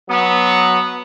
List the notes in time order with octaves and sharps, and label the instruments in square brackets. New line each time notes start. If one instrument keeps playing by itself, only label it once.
[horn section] F#3 B3